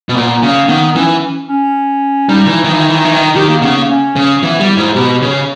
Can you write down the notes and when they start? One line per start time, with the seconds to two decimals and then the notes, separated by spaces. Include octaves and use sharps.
0.09 B2
0.15 A#2 B3
0.43 C#3 A#3
0.69 D#3 B3
0.96 E3 C#4
1.49 C#4
2.29 G3 D#4
2.47 E3
2.64 D#3
2.73 E3
2.80 D#3
2.89 E3
2.97 D#3
3.05 E3
3.12 D#3
3.36 D#3 G4
3.49 A#3
3.62 C#3 B3
3.76 A#3
3.89 C#4
4.16 C#3
4.42 E3 B3
4.60 G3
4.69 E4
4.77 G#2
4.95 B2 G4
5.22 C#3